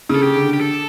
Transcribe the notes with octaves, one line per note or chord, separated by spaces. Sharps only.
C#3
A4
G4
D3
G4
A4